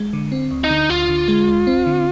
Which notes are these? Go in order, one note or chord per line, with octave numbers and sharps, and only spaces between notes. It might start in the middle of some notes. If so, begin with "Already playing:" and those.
Already playing: G#3
D3
C4
D2
D#4
D3
D2 F4
D3
G#3
D2
C4
D3